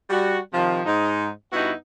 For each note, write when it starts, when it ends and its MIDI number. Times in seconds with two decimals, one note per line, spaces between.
0.10 0.39 55
0.10 0.39 66
0.53 0.81 48
0.53 0.81 51
0.53 0.81 53
0.85 1.28 44
0.85 1.28 63
1.52 1.72 43
1.52 1.72 59
1.52 1.72 63
1.52 1.72 64
1.52 1.72 66